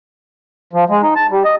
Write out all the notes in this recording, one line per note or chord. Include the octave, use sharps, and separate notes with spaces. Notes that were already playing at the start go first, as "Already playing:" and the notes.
F3
G#3
D#4
A5
G3
D#5